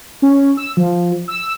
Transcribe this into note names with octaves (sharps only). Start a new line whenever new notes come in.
C#4
E6
F3
E6